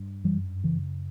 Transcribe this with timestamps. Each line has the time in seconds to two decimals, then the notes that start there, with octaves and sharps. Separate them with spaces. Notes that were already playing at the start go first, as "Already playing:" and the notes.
Already playing: G2
0.24 F#2 E3 G3
0.64 C#3 E3